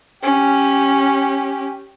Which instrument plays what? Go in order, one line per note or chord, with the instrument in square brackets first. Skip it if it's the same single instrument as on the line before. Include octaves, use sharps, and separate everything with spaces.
[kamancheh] C#4 G4